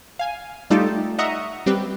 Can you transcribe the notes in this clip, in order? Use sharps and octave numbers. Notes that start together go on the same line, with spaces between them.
F5 G#5
G3 A3 D#4 F4 G4 A4
D#5 E5 F#5 A#5 C#6 D#6
G3 C4 G4 B4